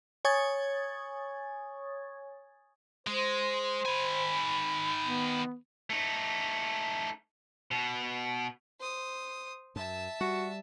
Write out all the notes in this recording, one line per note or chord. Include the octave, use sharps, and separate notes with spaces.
C#5 G#5 C#6 D#6 G#6 A6
G#3 C5
D#3 G#5 B5
B3
A3 D#4
B2
C5 D#6
F#2 E5 A5
G3 F#4